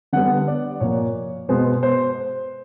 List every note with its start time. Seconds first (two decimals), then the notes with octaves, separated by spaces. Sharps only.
0.13 D3 G3 B3 F#5
0.48 D5
0.80 A#2 F3 A#3 C#5
1.49 B2 G#3 B3 C5
1.83 C5